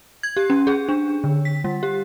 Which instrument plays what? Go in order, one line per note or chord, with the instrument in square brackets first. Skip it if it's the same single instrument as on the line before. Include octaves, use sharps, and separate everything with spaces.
[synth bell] G#6
G4
C#4
G#4
D4
D3
B6
G3
G4